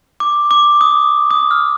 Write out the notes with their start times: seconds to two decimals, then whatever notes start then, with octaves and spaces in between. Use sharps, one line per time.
0.20 D6
0.51 D6
0.81 D#6
1.31 D#6
1.51 F6